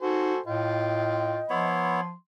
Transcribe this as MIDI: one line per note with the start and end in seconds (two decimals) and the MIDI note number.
0.02 0.32 63
0.02 0.39 66
0.02 0.39 69
0.02 0.39 72
0.02 0.39 80
0.46 1.41 45
0.46 1.44 65
0.46 1.68 75
0.46 1.44 79
1.50 2.13 53
1.50 2.01 59
1.50 2.01 64
1.50 2.01 73
1.50 2.14 84